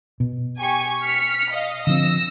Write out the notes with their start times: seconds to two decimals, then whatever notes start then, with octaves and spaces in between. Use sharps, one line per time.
0.20 B2
0.61 G4 G#5 C#6
1.01 F6 B6 C#7
1.53 D#5 F5
1.87 D3 F3 C4 E6 A#6